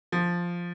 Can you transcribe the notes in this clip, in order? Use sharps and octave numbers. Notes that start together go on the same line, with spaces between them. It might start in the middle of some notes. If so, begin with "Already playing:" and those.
F3